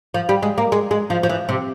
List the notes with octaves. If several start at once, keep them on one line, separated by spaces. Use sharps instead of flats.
F3
G3
G#3
A#3
G#3
G#3
F3
F3
E3
C3